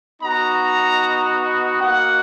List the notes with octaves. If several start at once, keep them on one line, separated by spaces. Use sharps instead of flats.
B3 D#4 F#4 A#5
A#3 D#4 F#4 F#5